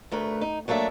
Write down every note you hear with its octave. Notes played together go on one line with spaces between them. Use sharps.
D2 A3 A#4 B4
D#4
F#3 A3 A#3 D4 E5